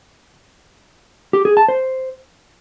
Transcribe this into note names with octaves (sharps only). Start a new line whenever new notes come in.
G4
G#4
A5
C5